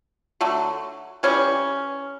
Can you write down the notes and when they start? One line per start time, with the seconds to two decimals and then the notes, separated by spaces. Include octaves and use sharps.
0.41 D3 F#3 A3
1.23 C3 E3 G3 C#4